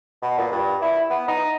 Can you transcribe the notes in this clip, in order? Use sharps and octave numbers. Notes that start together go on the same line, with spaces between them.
B2
A#2
G2
E4
B3
D#4